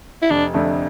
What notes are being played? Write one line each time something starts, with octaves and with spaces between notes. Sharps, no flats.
E4
F1 D4
F2 D3 A3 D4